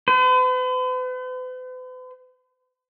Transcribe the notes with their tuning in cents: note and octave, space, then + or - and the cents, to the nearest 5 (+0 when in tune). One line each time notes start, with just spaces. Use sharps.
B4 +45